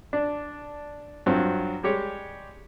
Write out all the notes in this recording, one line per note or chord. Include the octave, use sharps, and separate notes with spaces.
D4
G2 F#3 C4 F4
G3 G#3 G4 C#5